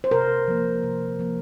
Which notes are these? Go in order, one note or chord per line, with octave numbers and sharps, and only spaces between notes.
C5
C3 A#4
F3 A#3
C3
F3 A#3